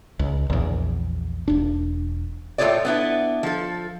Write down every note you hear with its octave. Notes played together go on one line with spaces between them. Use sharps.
C#2
A#1 E2
E1 D4
A2 A3 F4 G#4 C#5 D5
B3 D4 E4
F3 A4